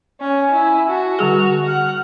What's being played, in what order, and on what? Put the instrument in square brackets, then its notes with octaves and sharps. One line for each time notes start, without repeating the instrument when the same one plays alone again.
[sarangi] C#4 [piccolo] G#5
[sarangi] E4
[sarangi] F#4 [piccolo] A5
[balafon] D3 G3 G#4 [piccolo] F7
[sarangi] F#5 [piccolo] F6